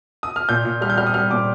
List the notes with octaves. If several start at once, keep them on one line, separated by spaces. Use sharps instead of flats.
D#6
F6
A#2 G6
A#2
G3 F6
G6
G3 F6
D#6
G3 F6
A#2 D6